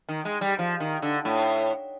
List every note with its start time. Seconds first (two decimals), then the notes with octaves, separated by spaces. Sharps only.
0.09 D#3
0.25 G#3
0.41 G3
0.59 F3
0.80 D#3
1.02 D3
1.25 A2